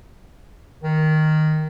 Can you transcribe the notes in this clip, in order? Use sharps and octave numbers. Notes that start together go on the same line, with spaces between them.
D#3